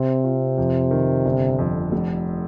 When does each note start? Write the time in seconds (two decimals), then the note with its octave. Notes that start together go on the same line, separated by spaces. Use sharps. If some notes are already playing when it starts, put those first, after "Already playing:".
Already playing: C3 C4
0.24 F4
0.58 F2
0.91 D#3
1.25 G1
1.59 F2
1.92 F1